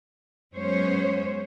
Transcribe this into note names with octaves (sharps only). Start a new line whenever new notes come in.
F#2 G#3 B3 C#4 C5 C#5